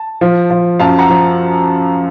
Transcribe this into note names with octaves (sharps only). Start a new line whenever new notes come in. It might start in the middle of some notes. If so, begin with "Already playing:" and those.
Already playing: A5
F3
F3
F#2 F5 A5
F#5 A#5
F3